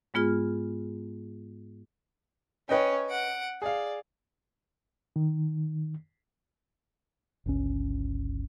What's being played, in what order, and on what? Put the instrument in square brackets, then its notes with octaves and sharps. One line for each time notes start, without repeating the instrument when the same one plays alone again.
[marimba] G#2 G#3 B3 F4 G#4 F6
[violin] C#4 C#5 [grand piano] B4 D#5 G5
[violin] F#5 D7
[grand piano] G#4 F5 [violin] D5
[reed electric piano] D#3
[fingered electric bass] G1 C#2 C#4